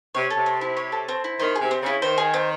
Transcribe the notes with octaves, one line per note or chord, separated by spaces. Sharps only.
C3 C#5
C3 A4
C4
E4
C#5
A4
C4
E4
D#3 C5
G#4
C3
C4
C#3 E4
D#3 C5
G#4
C4